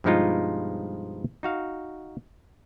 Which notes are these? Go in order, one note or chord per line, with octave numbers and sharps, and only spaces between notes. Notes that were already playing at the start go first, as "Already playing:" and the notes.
G2 B2 F3 G#3 D#4 F4
D#4 F#4 F5